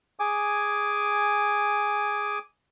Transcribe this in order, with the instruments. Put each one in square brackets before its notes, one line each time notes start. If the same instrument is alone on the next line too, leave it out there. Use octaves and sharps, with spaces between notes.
[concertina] G#4 G#5 D6